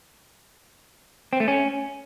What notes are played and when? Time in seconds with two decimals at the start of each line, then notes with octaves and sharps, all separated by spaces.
1.33 C4
1.40 A3
1.48 C#4